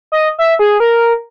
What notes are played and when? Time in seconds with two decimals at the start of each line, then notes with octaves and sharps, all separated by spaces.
0.12 D#5
0.38 E5
0.59 G#4
0.80 A#4